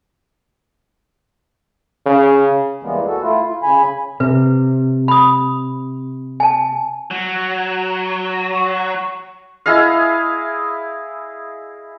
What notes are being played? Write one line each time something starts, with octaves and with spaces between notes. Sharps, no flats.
C#3
E2 E3 G3 G#3 A#3 B3
F#4 A4
A3 E4 F4
F4
C#3 G#5 B5
C3 B4
B5 D#6
G#5 A5
F#3
C#6
E4 G#4 D#5 F5